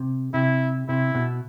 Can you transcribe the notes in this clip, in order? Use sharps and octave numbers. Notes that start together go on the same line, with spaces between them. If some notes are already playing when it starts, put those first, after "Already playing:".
Already playing: C3
C3 E4
C3 E4
B2